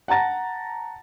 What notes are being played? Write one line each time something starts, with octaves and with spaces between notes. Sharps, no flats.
F#5 A5 A#5 A6 A#6